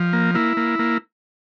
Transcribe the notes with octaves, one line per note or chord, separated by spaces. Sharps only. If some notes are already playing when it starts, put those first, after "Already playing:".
Already playing: F3
A#3
A#3 E4
A#3
A#3